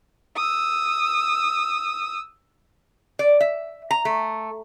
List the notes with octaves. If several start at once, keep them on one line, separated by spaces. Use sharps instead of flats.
D#6 E6
D5
E5
A#5
A3